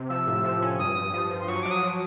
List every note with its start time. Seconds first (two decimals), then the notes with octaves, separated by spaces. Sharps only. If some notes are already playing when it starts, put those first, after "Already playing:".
Already playing: C3
0.09 F3 E6
0.27 A2
0.44 F3
0.62 C#4
0.79 G2 D#6
0.96 G2
1.14 F3
1.31 F3
1.40 C6
1.48 F#3 C#6
1.63 F#3 D6
1.71 D#6
1.83 F#3